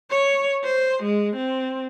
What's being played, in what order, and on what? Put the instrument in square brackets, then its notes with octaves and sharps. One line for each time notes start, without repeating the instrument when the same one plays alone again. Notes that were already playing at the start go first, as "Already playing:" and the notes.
[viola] C#5
C5
G#3
C4